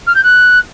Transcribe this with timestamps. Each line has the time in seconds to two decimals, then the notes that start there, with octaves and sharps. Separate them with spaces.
0.06 F6
0.15 G6
0.23 F#6